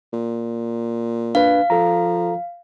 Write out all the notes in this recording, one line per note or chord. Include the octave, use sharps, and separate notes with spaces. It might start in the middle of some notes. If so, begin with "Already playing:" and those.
A#2
D4 B4 F5
F3 A4 A#5